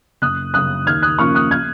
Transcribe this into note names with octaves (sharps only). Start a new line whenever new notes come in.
F#1 D#6 F#6
F#2 C#3 D#6 F#6
D#2 F6 G#6
D#6 F#6
C#3 F3 A#3 C#4 C#6 F6
D#6 F#6
F6 G#6